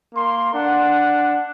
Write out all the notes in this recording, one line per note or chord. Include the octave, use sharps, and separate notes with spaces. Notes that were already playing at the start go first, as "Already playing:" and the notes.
A#3 C6
D4 F#5